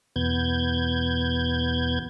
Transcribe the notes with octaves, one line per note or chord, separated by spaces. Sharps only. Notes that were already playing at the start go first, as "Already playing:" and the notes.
E2 B2 B3 G6 G#6